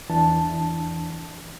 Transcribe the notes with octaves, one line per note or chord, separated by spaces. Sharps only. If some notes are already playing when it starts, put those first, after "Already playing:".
E2 E3 D4 A5